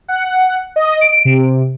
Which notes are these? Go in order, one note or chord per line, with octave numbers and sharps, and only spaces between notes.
F#5
D#5
D7
C3